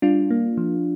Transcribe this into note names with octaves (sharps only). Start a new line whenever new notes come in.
G3 D4 F4
A#3
F3